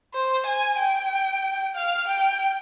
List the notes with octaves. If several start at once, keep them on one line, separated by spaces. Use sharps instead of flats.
C5
G#5
G5
F5
G5